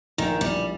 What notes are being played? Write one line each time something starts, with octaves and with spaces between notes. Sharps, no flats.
A#1 D#3
A#1 G3